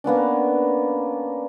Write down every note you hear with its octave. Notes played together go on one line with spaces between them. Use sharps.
A#3 B3 C#4 D4